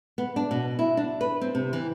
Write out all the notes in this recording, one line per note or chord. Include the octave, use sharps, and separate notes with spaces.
B3
D4
B2
E4
D4
B4
C4
C3
E3